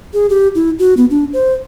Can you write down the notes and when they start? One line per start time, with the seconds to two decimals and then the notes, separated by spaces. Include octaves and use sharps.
0.14 G#4
0.30 G4
0.55 E4
0.79 F#4
0.97 B3
1.10 D4
1.33 C5